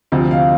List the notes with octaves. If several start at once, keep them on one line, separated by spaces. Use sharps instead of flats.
D2 C3 F3
F5